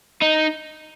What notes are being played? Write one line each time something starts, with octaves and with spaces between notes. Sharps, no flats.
D#4